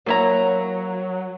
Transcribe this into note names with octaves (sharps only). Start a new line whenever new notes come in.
F3 F#3 A#3 E4 C#5 A#5